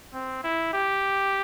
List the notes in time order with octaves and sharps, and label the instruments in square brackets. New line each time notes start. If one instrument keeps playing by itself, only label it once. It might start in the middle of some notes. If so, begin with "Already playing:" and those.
[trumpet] C4
E4
G4